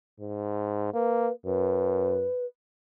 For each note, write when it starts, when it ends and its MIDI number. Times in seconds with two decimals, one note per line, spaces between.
0.20 0.91 44
0.94 1.29 58
0.94 1.32 71
1.45 2.29 42
1.45 2.45 71